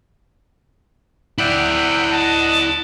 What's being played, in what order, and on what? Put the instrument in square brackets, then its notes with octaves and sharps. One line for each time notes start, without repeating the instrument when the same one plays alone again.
[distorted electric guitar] E4 D5 [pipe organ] E5 F#5 G5
[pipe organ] D#5 F#5 D#6 [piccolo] A5